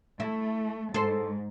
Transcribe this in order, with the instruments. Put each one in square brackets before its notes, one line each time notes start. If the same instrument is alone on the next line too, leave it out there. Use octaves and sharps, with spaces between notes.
[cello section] A3 [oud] E4
[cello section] G#2 [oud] A4 C5